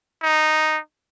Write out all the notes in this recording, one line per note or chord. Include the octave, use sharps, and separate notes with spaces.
D#4